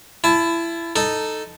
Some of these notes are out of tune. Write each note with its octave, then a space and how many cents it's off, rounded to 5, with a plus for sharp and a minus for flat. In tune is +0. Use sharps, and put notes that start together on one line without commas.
E4 +25 A5 -15
D#4 -5 A4 +0